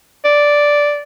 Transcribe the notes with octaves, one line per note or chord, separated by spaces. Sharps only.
D5